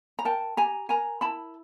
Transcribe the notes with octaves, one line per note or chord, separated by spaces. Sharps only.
A#5
A#4 G5 A5
G4 G#5 A#5
A#4 G#5 A#5
E4 A5 B5